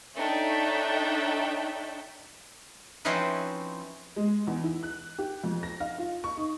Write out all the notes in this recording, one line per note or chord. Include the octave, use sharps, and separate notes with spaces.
D4 D#4 A4 C#5 E5 G5
F3 C4 C#4 D#4 E4 B4
G#3
E2
E4
F#6
G4
F2
A#6
F5
F4
C#6
D#4